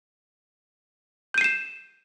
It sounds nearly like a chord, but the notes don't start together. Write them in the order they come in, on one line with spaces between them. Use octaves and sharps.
G6 D#7 C7 E7